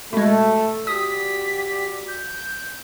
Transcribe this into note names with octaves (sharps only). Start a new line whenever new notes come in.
B2 G#3 A3
F#4 G4 D5 D#6 B6
G6